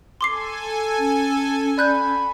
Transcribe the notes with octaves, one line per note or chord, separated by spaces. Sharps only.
A4 G#5 C6 D6 C7
C#4
D5 B5 F#6 G6